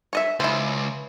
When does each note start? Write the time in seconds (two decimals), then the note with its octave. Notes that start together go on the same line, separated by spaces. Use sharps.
0.13 C#5 D#5 E5
0.40 C#2 E4 C5